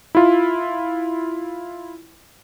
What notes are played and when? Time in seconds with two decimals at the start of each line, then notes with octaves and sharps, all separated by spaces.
0.15 E4 F4